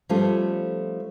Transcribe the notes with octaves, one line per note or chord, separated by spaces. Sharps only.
F3 G3 A3 C#4 F4 A4